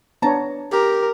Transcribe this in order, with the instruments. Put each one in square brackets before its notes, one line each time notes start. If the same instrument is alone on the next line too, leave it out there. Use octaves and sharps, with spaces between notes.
[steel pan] B3 D4 C#5 [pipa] A5 A#5
[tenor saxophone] G4 [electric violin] A#4